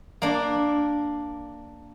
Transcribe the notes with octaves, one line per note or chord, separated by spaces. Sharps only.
A#3 D4